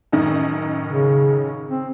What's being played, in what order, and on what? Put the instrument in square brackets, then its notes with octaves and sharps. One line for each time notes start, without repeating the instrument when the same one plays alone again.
[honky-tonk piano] A1 F#2 D#3
[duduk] C#3
C4